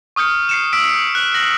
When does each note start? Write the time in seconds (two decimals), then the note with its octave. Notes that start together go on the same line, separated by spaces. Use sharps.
0.16 C#6 D#6 F6 G6 C#7
0.49 C7 C#7 E7
0.73 E6 B6 D7
0.85 B6
1.15 F#6
1.34 A#6 F#7